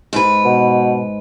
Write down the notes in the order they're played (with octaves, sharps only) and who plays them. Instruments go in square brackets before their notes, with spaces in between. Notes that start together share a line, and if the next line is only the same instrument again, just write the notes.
[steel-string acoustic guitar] G#2 B4
[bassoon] B2